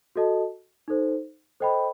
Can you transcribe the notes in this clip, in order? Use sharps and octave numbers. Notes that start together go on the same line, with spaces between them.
F#4 A4 D#5 A5
D#4 A4 C5
A4 C5 D#5 G5 B5